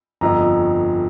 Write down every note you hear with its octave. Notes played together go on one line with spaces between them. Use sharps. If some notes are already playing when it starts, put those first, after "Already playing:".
G1 F2 F3 A#5